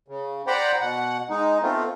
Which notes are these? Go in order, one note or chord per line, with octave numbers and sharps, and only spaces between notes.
C#3
C5 D5 F#5 G5 A#5 B5
B2 F#5
G#3 D#4
A3 B3 C4 F4